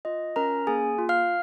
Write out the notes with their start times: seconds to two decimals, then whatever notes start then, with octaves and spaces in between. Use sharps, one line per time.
0.05 F4 D#5
0.36 C#4 A#4 A#5
0.67 A#3 G#4 G#5
0.99 F4
1.09 F5 F6